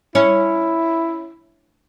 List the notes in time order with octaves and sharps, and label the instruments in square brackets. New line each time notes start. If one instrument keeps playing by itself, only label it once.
[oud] C#4 [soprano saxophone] E4